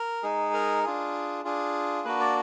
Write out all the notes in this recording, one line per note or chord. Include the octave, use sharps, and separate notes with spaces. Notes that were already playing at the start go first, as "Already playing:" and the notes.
Already playing: A#4
G#3 D#4 G#4
A#4
D4 F4 G#4
D4 F4 G#4
A#3 D4 F#4 B4
D5